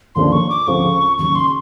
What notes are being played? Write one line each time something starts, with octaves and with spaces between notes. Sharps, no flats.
D#2 D3 F3 A#3 D4 C6
C#6
D6
D2 C#3 F3 G#3 C4 C#6
D#2 C#3 F#3 C#6
C6